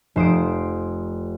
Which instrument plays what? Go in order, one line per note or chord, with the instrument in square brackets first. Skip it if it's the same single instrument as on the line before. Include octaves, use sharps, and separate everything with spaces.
[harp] F1 C5 D#6 D7